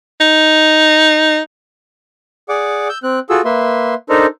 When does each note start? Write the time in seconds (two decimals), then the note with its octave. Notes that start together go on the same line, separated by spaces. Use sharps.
0.20 D#4
2.49 G#4 D5 F#5 D6
2.89 E6 G6
3.03 C4 F#6
3.30 F4 F#4 G#4 A4 E6
3.45 A#3 B4 E5 C6
4.09 D4 D#4 A4 A#4 C5